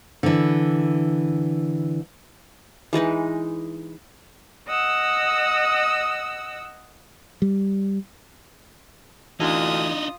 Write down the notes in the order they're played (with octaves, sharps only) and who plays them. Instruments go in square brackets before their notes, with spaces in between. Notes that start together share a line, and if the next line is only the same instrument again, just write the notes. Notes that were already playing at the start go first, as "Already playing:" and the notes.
[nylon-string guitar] D3 E3
[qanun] E3 G#3 D#4 B4
[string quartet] D#5 F#5 E6
[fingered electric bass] G3
[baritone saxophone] D2 [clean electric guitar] E3 [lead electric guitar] D4 D#4 [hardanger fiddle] F4 D#6